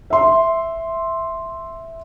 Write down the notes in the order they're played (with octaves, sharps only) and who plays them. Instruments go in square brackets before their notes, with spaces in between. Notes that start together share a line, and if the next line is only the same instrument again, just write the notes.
[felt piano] E5 C6